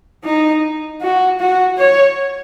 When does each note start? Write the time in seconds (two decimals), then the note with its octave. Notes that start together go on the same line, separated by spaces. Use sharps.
0.25 D#4
1.02 F#4
1.40 F#4
1.78 C#5